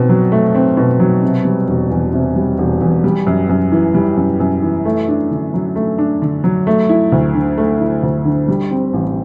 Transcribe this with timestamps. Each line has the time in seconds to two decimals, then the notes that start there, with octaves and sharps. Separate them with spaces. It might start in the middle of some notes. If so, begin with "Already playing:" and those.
Already playing: B2 C4
0.09 F#3
0.32 A3
0.55 C4
0.77 B2
1.00 F#3
1.22 C3
1.45 G3
1.68 E1
1.91 E2
2.13 C3
2.36 G3
2.58 E1
2.81 E2
3.04 G3
3.27 F#2
3.49 F#2
3.72 E3
3.95 G3
4.17 F#2
4.40 F#2
4.62 E3
4.85 A3
5.08 D4
5.31 D3
5.54 F#3
5.76 A3
5.98 D4
6.22 D3
6.44 F#3
6.67 A3
6.89 E4
7.12 D2
7.35 D3
7.58 A3
7.80 E4
8.03 D2
8.25 D3
8.48 G3
8.71 C4
8.94 A1